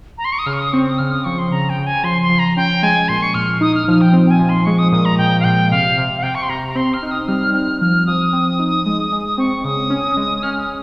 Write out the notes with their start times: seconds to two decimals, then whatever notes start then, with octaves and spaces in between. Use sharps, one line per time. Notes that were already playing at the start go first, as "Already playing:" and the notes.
0.18 A#5
0.25 C6
0.32 C#6
0.39 D#6
0.46 C#3 F6
0.53 C#6
0.59 D#6
0.73 C4 C#6
0.89 D#6
0.98 C#3 F6
1.11 D#6
1.25 F3 C#6
1.38 C6
1.51 C#3 A#5
1.69 G5
1.78 C#3
1.86 G#5
2.03 F3 C6
2.22 C6
2.30 F3
2.39 A#5
2.56 C#4 G5
2.83 G#3 G#5
3.08 A#2 C6
3.22 C#6
3.34 A#2 F6
3.61 D#4 D#6
3.75 F6
3.88 F3 F6
4.01 G5
4.13 C4
4.27 G5
4.31 G#5
4.39 F3
4.49 C6
4.66 G#3 C#6
4.79 D#6
4.92 A#2 D#6
5.05 A#5
5.18 A#2 G5
5.40 F5
5.44 A#2 G5
5.71 C3 F5
5.98 C3
6.17 F5
6.23 C3 G5
6.35 C#6
6.43 C6
6.49 C3 A#5
6.68 A#5
6.75 C4 C6
6.94 F6
7.02 D#4
7.11 D#6
7.28 G3 F6
7.54 C4 F6
7.81 F3 F6
8.07 F3 D#6
8.33 C4
8.59 D#4
8.86 G#3
9.12 G#3
9.38 C4 C#6
9.64 C#3 D#6
9.90 C#4
10.17 G#3
10.43 C#4 F6
10.59 D#6